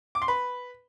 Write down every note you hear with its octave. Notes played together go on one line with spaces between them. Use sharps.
D6
C6
B4